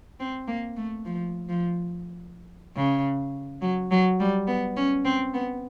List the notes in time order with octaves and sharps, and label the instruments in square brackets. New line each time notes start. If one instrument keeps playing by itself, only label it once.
[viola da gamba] C4
A#3
A3
F3
F3
C#3
F#3
F#3
G3
B3
C#4
C4
B3